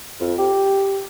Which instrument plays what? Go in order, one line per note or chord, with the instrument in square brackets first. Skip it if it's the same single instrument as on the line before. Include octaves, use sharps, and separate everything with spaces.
[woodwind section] F2
G4